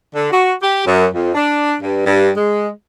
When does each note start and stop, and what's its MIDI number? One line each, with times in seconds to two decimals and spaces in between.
0.13 0.28 50
0.31 0.52 66
0.61 0.81 67
0.85 1.06 42
1.13 1.29 41
1.33 1.74 62
1.80 2.04 43
2.06 2.29 43
2.36 2.68 56